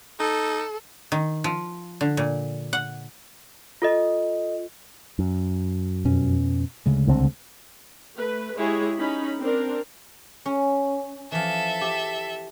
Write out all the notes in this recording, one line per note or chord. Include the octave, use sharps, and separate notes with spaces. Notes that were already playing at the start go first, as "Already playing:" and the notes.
D#4 A4
D#3
F3
D3
A#2
F#5
F4 A4 D#5
F#2
F2 B2 C#4
D2 C#3 G#3
C2 D3 C4
A3 B4
G#3 E4 G4 G#4 C#5
C#4 D#4 B5
C4 D4 A#4
C#4
E3 F3 A4 E5
G4